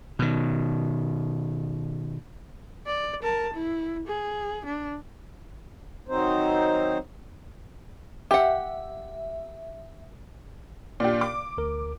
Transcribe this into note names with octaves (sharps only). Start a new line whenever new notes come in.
B2 D#3
D5
A#4 A5
E4
G#4
D4
D#3 F#3 C4 D#4 C5
G4 E5 F#5
A#2 D4 G4 D5
D6
D2 A#4